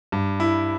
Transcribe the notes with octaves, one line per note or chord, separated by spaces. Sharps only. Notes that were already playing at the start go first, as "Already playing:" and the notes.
G2
E4